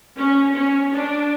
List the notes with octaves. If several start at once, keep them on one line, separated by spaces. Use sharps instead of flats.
C#4
C#4
D4